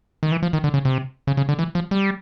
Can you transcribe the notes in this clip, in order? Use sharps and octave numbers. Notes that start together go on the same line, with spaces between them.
D#3
E3
F3
D#3
D3
C#3
C3
C#3
C#3
D3
E3
F3
G3